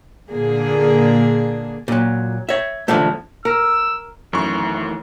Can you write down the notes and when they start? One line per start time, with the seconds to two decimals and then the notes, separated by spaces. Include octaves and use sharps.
0.29 A#2 D3 A#3 D4 G#4
1.88 A#2 F#3
2.49 C#5 E5
2.88 D3 E3 F3 A3
3.45 A#4 E6
4.33 F#2 D#3 E3 A3 C#6